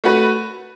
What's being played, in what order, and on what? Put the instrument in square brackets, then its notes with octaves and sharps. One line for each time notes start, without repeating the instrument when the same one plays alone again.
[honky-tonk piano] A3 F#4 B4